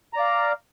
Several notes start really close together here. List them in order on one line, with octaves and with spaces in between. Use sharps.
A#5 D5 F5